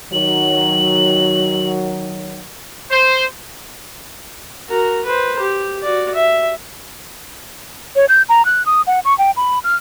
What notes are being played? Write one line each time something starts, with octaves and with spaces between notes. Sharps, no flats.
D#3 F#3 F#7
C5
F#4 A#4
B4 C5
G4
F#4 D5
E5
C#5
G6
A#5
F#6
D#6
F#5
C#6
G5
B5
F6